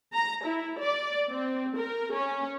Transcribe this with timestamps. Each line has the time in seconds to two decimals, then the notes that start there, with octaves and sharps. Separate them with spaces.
0.13 A#5
0.44 E4
0.79 D5
1.30 C4
1.76 A#4
2.13 C#4